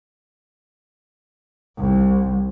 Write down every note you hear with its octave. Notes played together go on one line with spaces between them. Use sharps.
C2